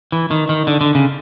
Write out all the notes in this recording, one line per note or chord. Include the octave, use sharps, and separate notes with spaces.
E3
D#3
D#3
D3
D3
C#3